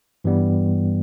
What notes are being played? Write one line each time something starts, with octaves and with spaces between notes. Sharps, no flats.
G2 E3 G3 B3